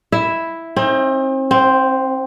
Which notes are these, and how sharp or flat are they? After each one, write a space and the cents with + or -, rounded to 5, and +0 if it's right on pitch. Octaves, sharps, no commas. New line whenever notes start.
E4 +0 E5 +0
C4 +35 D#4 +35
C4 +0 F#5 -40